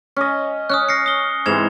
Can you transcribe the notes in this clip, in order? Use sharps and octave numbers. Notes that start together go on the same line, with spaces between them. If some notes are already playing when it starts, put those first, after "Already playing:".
C#4 D#5
C#4 D#6 F6 F#6
A#6 C7 C#7
D#6 G7
G#2 C3 E3 G#6 E7 F7